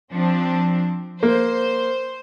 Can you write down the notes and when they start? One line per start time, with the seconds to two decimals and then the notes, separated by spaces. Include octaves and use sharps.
0.11 F3 C4 D4
1.23 A#3 C5